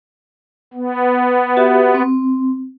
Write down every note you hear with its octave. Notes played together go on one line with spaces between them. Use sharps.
B3
F#4 G4 E5
C4